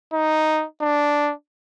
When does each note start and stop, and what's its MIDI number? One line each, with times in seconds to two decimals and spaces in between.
0.13 0.65 63
0.81 1.32 62